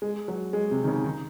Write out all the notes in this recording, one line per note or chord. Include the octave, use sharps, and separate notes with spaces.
G#3
F#3
G#3
C3
D#3
C#3
D#3